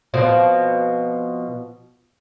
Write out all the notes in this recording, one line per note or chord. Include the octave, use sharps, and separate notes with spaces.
B2 F3 C4